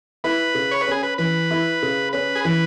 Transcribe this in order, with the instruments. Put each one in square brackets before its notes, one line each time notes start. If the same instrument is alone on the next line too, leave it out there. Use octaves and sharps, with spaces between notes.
[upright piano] E4 [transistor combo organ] B4
[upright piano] C#3
[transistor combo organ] C#5
B4
[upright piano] C#4 [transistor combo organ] G#4
[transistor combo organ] B4
[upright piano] E3 [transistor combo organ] B4
[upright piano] E4
C#3
[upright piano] C#4 [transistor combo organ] B4
[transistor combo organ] G#4
[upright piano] E3 [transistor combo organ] B4